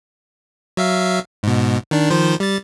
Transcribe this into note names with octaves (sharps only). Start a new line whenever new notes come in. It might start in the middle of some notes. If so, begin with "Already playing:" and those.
F#3 E5 F5
G#2 B2
D#3 D4
D#3 F3 C5
G3 A6